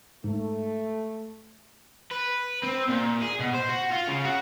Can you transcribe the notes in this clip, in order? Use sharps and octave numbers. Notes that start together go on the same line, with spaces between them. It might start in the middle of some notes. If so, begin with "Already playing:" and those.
G#2 A3
B4
C4
A#2
G#4
B2
C5
F#4
F4
C#3
F#4